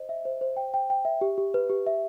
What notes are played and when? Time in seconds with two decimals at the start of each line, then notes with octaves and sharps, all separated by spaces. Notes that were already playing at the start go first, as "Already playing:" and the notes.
Already playing: C5 D#5
0.09 E5
0.25 C5
0.41 C5
0.57 G5
0.74 G5
0.90 G5
1.05 E5
1.21 G4
1.38 G4
1.54 B4
1.69 G4
1.87 E5